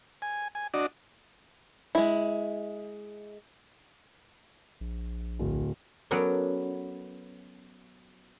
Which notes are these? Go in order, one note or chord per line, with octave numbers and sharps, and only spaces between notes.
G#5
G#5
D4 F#4 D5 D#5
G#3 E4
A#1
D1
F#3 B3 C#4 A4 A#4 D5